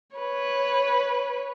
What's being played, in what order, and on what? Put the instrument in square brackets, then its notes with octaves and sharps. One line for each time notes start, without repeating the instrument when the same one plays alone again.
[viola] B4 C#5